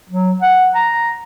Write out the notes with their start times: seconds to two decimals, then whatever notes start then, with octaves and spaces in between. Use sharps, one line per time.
0.09 F#3
0.41 F#5
0.75 A#5